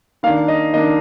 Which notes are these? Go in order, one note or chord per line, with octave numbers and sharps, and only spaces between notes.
D#3 A#3 D4 F5
D#5
D#3 A#3 D4 D#5